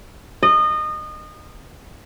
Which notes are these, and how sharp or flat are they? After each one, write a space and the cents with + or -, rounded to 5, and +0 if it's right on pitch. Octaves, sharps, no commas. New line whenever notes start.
D#5 -25